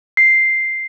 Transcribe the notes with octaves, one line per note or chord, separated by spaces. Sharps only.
C7